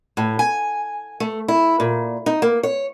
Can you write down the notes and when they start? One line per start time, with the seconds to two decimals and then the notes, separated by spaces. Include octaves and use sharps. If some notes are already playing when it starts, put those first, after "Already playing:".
0.17 A2
0.39 G#5
1.20 A3
1.48 E4
1.80 A#2
2.26 D#4
2.42 A#3
2.63 C#5